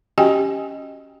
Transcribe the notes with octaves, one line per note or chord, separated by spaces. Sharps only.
C#4 F#4 G4 D#5 G5 G#5